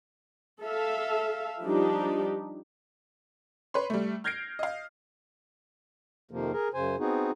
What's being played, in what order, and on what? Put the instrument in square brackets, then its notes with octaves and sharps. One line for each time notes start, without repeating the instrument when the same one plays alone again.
[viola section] A4 E5 F5
F3 G3 D4 D#4 G4
[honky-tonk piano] B4 C#5 B5 C6
G3 A3
F6 G6 G#6 A#6 C7 D7
D#5 F5
[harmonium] F2 C3 D#3 F3 A#3
G#4 A#4
F#2 C#3 C5 G#5
B3 C4 D#4 F#4 G#4